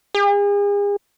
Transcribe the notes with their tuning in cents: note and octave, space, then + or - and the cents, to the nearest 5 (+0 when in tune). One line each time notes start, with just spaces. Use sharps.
G#4 -40